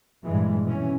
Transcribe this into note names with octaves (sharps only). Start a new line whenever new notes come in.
G2 A#2 E3 G#3
B2 E3 C#4